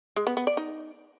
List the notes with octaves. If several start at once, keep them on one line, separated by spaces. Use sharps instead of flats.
G#3
B3
B3
D5
D#4